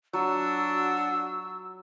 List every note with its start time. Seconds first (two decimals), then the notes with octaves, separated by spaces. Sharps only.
0.13 F#3 D4 F#4 E6